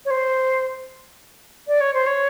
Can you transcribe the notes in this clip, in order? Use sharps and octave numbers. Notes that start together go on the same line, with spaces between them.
C#5
C5
D5
C#5
C5
C#5